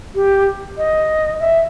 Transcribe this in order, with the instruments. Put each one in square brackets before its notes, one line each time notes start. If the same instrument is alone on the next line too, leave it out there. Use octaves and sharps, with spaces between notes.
[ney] G4
D#5
E5